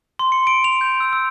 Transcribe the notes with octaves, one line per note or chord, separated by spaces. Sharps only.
C6
C#7
D7
F7
G6
E6
E6